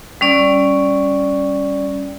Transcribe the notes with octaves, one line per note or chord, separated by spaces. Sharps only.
G3 C#4 D5